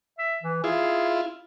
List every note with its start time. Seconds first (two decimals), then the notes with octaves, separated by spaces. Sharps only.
0.19 E5
0.43 E3
0.64 E4 F4 G#4